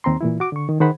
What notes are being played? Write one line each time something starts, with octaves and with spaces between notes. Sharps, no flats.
D#2 C4 A#5 C6
A#2 E3 E4
F#4 D6
D3 C#6
D#3
D#3 G#4 C5 F#5 B5